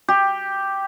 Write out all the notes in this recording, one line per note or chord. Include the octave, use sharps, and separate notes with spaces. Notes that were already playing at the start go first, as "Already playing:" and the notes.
G4